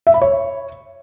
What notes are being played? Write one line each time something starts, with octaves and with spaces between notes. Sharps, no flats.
E5
B5
C#5